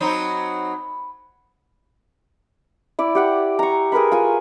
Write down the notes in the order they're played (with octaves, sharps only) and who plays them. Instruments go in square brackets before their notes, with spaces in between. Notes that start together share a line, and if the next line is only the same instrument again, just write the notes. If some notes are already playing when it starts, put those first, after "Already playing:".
[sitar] F#3 C4 D#4 [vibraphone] B5
[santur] E4 D5
G4 F#5 G5
A#5 C#6
G#4 A#4 B4 B5
F4 G#5